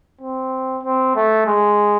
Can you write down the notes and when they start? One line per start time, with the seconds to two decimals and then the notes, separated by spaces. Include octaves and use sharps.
0.21 C4
0.84 C4
1.16 A3
1.47 G#3